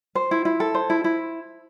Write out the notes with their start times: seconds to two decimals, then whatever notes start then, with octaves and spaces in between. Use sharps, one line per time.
0.15 C5
0.31 E4
0.45 E4
0.60 A4
0.75 C5
0.90 E4
1.04 E4